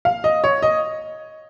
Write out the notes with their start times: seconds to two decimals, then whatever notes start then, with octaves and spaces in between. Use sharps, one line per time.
0.05 F5
0.24 D#5
0.44 C#5
0.62 D#5